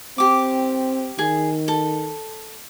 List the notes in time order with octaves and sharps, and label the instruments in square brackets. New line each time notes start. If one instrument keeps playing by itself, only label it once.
[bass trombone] C4 [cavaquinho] G4 D6
[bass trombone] D#3 [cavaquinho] G#4
[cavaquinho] A4